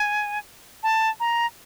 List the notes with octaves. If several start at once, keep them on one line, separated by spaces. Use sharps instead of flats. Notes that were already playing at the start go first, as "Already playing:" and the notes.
Already playing: G#5
A5
A#5